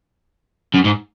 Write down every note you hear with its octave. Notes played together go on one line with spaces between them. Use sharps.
F#2
G#2